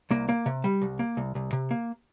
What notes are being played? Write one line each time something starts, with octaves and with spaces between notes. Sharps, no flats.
C2 A#3
A#3
C3
G3
C2
A#3
C2
C2
C3
A#3